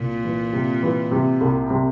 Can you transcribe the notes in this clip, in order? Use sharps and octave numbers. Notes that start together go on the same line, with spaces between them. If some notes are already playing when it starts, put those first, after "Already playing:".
Already playing: C2 A#2
E3
C3
E3
C3
C2
C3